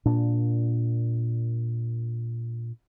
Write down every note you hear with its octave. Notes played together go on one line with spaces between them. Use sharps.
A#2 D4